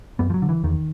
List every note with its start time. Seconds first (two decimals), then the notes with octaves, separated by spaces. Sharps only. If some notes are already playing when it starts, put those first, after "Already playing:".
0.19 F#2 B3
0.30 F3
0.34 F#3
0.42 D3
0.49 E3
0.64 E2 D#3